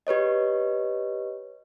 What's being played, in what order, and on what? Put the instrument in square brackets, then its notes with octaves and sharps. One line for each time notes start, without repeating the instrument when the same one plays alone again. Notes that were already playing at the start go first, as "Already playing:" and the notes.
[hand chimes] G4 B4 C#5 D#5